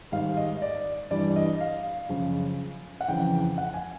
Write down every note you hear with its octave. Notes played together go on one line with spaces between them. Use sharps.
G#2 D#3 G3 F5
D#5
D5
G2 E3 G3 D5
D#5
F5
F#2 C#3 F3
F#5
F2 C#3 E3 G5
F#5
G#5